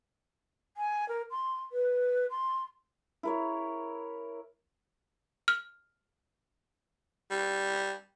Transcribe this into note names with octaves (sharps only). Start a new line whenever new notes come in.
G#5
A#4
C6
B4
C6
E4 A#4 C#5
F6
G3